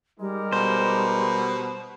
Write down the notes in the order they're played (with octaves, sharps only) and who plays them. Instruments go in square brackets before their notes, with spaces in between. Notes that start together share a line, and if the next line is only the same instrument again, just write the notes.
[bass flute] G3 [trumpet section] G#3 D#4 A#4
[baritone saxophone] B2 [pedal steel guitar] C5